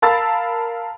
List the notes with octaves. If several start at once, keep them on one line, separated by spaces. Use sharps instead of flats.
A#4 F5 A5 B5 E6 A6